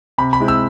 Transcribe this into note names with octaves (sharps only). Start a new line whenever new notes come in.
C3 B5
B5
G#3 C4 E4
E6